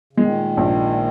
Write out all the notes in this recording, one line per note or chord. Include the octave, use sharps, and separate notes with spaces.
C#3
A#2 D#3 G#3
A#1